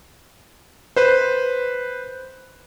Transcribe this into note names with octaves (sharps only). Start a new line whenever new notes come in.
B4 C5